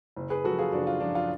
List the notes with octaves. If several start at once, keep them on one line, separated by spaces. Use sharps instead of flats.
F#1
G#4 B4
F#2 F3 F#4 A4
F4 G#4
F#1 D4 F#4
F4
F#2 F3 D4
F4